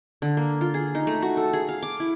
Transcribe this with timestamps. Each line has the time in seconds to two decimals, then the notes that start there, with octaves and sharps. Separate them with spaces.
0.22 D3
0.37 A#3
0.61 F4
0.74 G#4
0.95 D#4
1.07 A3
1.22 F#4
1.37 A4
1.53 G#4
1.69 F5
1.83 D6
2.00 E4